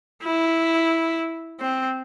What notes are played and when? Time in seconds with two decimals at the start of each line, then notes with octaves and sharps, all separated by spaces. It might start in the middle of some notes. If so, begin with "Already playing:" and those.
0.23 E4
1.61 C4